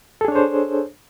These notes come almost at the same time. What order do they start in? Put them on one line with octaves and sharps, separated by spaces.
A4 G#4 D4 C#5 C5